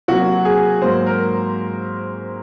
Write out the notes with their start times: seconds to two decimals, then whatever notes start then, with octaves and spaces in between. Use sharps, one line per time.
0.08 C3 F#3 A#3 F#4
0.45 G#4
0.82 G#2 F#3 A#3 C5
1.07 A#4